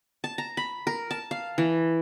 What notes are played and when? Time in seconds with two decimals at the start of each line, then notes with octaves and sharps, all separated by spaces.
0.24 A5
0.38 A#5
0.57 B5
0.87 A#4
1.11 A5
1.31 F5
1.58 E3